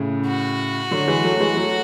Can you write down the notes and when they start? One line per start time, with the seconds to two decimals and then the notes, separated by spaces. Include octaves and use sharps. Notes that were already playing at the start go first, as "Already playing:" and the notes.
Already playing: A2 C#3
0.26 F#4
0.91 D3 F#3
1.08 E3 G#3
1.24 F#3 A3
1.40 E3 G#3
1.57 F#3 A3